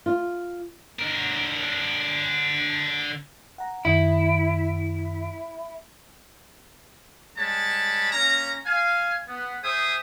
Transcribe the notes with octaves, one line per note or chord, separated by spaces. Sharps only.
F4
D3 A#4
F#5 A#5
F#2 D#3 E4
G3 G#3 C#5 A5 B5
A#3 C#4 A#5
F5 G#5
B3
G#4 C5 E5 G5 D#6